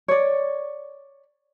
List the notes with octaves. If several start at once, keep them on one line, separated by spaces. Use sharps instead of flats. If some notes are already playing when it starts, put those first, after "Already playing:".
C#5 D5